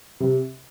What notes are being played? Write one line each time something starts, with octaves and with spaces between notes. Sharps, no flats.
C3